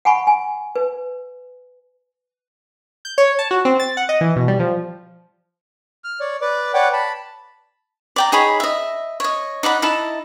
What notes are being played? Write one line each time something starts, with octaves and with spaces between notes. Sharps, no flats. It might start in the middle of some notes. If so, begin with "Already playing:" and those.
F#5 G#5 B5 C#6
G#5
B4
G6
C#5
A5
F#4
C4
A6
F#5
D#5
E3
B2
G3
F3
F6
C#5 D5
B4 D5 D6
B4 C#5 D5 F#5 G5 D6
A5 B5
D5 G5 A#5
D#4 G#4 C#5 B5
D#5 E5
C#5 D#5
D#4 D5 F#5 B5
D#4 E4 A5